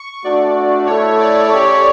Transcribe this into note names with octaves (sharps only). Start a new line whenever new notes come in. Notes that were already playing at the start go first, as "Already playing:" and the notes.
Already playing: C#6
A3 D4 F#4 D5
A3 E4 A4 C#5
D5
C#4 G4 C#5